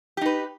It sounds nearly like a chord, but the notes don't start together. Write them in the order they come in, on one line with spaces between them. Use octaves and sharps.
G4 D#4 B4